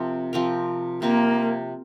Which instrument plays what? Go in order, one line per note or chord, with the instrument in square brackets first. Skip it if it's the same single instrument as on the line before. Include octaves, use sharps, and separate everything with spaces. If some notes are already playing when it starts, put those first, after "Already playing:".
Already playing: [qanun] C3 F3 C4 A#4
C3 F3 C4 A#4
[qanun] C3 F3 C4 A#4 [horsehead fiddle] A#3